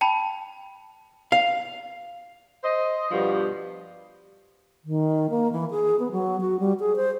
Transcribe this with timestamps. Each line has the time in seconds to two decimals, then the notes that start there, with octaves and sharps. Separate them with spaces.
0.01 G5 A5 B5
1.32 F5
2.64 C5 D#5
3.11 G2 B2 F3 G3 B3
4.85 D#3
5.30 A#3
5.52 E3
5.71 G#4
5.99 B3
6.12 F#3
6.41 F#4
6.60 G3
6.80 G#4
6.96 C5